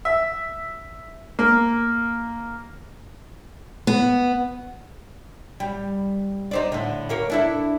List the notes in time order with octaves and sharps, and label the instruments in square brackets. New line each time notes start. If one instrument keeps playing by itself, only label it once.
[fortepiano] E5
A#3
[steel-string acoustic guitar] B3
[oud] G3
D#4 C5 D5
A2 D3
A#3 C#4 A#4
D4 E4 A4